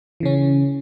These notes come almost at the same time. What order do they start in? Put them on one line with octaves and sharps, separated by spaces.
E3 C#3 C#4